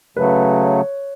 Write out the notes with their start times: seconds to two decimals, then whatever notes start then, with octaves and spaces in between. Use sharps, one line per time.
0.17 C#3 F#3 A3 B4
0.63 C#5